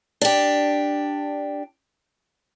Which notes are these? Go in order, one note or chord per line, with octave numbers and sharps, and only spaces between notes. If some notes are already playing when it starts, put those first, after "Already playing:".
D4 G4